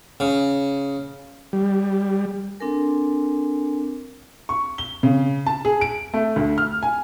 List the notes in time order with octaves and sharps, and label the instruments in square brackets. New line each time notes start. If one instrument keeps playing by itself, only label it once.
[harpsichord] C#3
[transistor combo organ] G3
[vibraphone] C4 D4 A4 A#4 G#5
[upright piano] C#6
G7
C#3
A5
G#4
D7
A3
D2
F6
G#5